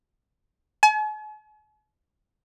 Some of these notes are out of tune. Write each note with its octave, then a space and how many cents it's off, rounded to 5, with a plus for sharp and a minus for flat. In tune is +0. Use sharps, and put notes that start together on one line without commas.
G#5 +45